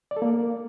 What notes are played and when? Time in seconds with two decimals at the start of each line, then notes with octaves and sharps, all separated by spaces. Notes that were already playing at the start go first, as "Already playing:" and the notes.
0.11 D5
0.17 A4
0.22 A#3